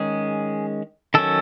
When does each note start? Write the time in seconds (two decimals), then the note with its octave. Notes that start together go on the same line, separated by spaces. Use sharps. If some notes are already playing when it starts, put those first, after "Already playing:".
Already playing: D#3 G#3 C#4 G#4
1.14 D#3 F#3 C#4 A4